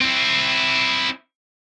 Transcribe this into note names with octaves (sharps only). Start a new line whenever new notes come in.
C4 E4